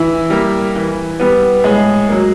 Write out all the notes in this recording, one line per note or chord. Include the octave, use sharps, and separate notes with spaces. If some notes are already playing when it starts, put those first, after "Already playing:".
Already playing: E3 E4
G3 A#3
E3
G3 B3
A2 G#3 G#4
F#3 A#3